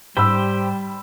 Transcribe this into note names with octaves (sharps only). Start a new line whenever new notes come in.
G#2 G3 G4 C5 G5 B5 E6